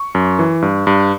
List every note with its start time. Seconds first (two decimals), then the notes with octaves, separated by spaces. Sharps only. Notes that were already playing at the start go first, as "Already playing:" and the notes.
Already playing: C#6
0.15 F#2
0.39 E3
0.62 G2
0.87 G2